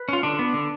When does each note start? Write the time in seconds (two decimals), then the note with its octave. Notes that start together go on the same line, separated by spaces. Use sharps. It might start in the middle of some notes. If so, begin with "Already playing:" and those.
Already playing: B4
0.09 C#4 F4
0.23 D3 D4
0.39 B3
0.54 D3